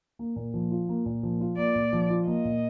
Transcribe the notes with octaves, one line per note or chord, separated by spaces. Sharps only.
A#3
A#2
F3
F4
A#3
A#2
F3
F4
A#3 D5
A#2
F3
F4
A#3 D#5
A#2